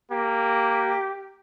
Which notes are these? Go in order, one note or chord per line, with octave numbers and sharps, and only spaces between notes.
A#3 G4